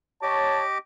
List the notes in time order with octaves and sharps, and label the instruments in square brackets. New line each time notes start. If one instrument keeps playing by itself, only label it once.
[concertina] G4 D#5 D6 [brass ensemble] C#5 A5